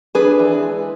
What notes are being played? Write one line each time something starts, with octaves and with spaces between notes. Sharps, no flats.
D4 G#4 B4
E3
G#3